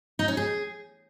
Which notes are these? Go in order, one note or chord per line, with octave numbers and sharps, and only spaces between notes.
D#4
C#4
G#4